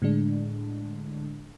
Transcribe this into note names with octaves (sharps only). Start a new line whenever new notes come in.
A2 D3 G#3 D4